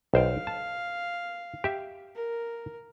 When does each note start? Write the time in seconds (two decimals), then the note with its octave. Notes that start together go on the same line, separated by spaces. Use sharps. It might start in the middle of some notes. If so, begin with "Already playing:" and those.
0.14 B1 C5 F5 G5
0.47 A5
1.64 G4 E5
2.15 A#4